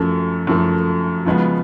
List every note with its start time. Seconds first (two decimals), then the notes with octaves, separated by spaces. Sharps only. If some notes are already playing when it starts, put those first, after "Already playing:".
Already playing: F#2 F3 A3
0.47 F#2 F3 A3
1.26 C#3 F3 G#3 B3